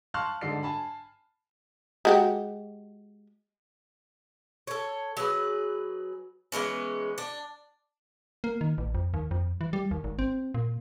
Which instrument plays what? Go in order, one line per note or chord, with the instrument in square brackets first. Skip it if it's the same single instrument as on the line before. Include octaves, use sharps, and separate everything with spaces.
[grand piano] F5 A5 C6 C#6 F6 F#6
G#2 D3 A4 D5 C7
G#5 A5 B5
[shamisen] G#3 F#4 G4
[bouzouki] A4 C#5
F#3 G#4 B4
E3 G#3 B3 C#4
D4
[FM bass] A#3
D#3
A1
F2
D#2
F2
E3
G3
D#2
G#1
C4
A#2